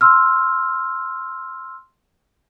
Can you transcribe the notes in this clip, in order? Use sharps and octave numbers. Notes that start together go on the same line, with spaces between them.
C6 E6 F6